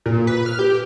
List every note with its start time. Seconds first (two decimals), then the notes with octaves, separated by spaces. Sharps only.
0.06 A#2
0.27 B4
0.46 F6
0.59 G4